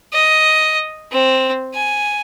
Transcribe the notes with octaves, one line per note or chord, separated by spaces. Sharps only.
D#5
C4
G#5